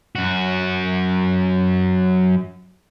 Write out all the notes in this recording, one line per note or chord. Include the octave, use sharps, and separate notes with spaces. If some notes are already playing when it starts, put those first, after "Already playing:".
F#2 F#4